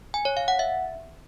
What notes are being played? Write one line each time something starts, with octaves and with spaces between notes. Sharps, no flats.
G#5
C#5
F5
F#5
E5